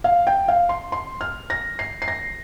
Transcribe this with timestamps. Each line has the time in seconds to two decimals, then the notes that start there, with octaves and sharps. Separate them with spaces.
0.04 F5
0.27 G5
0.48 F5
0.69 C6
0.92 C6
1.21 F6
1.50 A#6
1.79 C7
2.02 C7
2.08 A#6